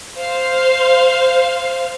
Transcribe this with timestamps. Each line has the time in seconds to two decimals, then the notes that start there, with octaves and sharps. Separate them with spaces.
0.17 C5 F5